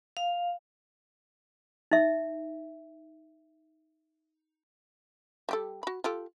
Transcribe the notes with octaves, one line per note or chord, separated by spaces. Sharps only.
F5
D#4 E5
G3 G4 A4
F#4 B5
F4 G4 A4